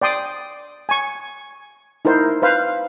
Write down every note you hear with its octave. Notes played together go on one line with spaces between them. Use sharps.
D5 G5 C6 D#6
G#5 C#6
D#4 E4 A#4 C5
B4 C5 F5